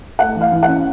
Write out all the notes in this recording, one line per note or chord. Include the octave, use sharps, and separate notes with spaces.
A3 F#5
E3
F5
E3
F#5
C#4